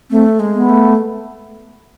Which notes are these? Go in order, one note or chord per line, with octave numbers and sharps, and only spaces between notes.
A3 C4
G#3
B3
A3